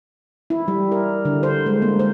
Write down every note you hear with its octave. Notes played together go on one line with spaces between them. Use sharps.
E4
G3
A#4
D3
C5
G#3
A#3
C5